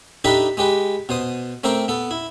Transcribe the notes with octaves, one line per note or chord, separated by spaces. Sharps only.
D4 D#4 G4 A4 B4 E5
G#3 G4 B4
B2 C5 D#6
A3 C4 A#4 C5 G5 D6
B3 A4
E4